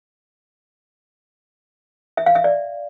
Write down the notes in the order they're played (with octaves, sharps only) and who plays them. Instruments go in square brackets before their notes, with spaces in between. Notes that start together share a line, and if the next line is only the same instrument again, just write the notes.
[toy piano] E5
F5
E5
D5